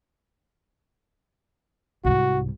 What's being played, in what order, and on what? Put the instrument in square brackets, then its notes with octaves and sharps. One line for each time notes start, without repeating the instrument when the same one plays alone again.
[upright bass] C2 G#2 [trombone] F#4